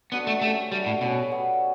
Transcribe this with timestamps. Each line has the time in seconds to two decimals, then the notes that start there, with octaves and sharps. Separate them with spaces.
0.12 B3 D4 F#4 A4
0.27 A3
0.41 A3 C#4 G4 C#5 E5
0.71 G3 A3 D4 F#4
0.86 A2
1.01 B2 C#4 G4 C#5 E5
1.31 G3 B3 F#4 C#5